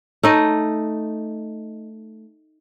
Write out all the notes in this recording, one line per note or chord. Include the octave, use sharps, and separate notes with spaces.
A3 D#4 D#5